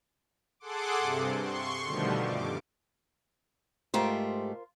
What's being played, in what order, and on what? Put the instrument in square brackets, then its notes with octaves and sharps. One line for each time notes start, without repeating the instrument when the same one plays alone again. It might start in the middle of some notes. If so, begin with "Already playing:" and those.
[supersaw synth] G#4 A4 F#5 C6 D6
G2 C3
C6 C#6
B2 D3 D#3 F3 G3 A3
G2 D6
[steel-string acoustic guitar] G#2 A3 G4 [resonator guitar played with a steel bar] F4 A#4 C5